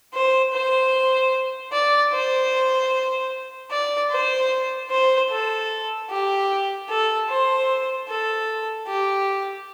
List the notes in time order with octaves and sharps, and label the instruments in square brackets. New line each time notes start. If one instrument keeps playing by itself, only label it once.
[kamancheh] C5
C5
D5
C5
D5
C5
C5
A4
G4
A4
C5
A4
G4